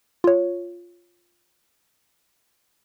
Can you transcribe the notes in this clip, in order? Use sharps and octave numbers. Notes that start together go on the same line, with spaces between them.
F4 C#5